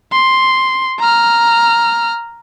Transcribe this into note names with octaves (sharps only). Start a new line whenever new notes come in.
C6
A#5 F6